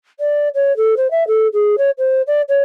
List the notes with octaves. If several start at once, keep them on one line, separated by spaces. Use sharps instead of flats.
D5
C#5
A4
C5
E5
A4
G#4
C#5
C5
D5
C#5